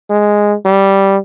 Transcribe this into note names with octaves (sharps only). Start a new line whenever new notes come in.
G#3
G3